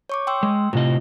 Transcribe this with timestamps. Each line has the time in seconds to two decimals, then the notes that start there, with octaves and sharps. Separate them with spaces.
0.09 C#5 C#6 D6
0.27 G5 C6 E6
0.43 G#3
0.73 A2 C3 F4 D#5